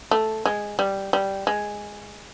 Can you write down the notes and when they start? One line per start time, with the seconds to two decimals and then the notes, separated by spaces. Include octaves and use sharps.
0.11 A3
0.45 G#3
0.79 G3
1.13 G3
1.47 G#3